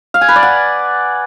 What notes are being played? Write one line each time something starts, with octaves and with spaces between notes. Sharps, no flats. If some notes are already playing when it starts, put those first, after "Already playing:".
F5
G#5
B4
D5
F#5